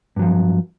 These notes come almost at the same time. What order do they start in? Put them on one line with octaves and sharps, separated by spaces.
G2 F#3 F3